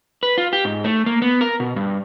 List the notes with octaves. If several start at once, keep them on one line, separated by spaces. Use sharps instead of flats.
B4
F4
G4
G#2
A3
A#3
B3
A#4
B2
G2